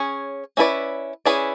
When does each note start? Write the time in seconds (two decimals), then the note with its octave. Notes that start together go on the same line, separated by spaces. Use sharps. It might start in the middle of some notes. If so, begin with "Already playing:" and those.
Already playing: C#4 G#4 C#5
0.57 C#4 E4 G#4 B4 D5
1.26 C#4 E4 G#4 B4 D5